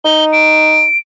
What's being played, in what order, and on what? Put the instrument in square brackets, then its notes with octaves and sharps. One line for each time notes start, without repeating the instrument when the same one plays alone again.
[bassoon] D#4 [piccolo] G7
[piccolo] D7